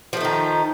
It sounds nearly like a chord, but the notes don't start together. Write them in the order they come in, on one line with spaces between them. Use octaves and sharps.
F3 A3 D#4 D#3